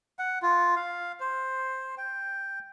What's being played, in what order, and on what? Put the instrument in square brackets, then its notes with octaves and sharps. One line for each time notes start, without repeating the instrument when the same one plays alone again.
[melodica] F#5
F4
F5
C5
G5